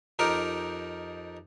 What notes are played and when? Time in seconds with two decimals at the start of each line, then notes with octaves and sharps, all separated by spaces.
0.19 F2 D#4 G4 A#4